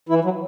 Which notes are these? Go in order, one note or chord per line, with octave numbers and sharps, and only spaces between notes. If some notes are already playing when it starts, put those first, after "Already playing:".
E3 E4
F#3